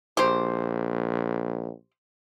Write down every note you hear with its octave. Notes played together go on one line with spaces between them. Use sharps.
A#1 G4 C5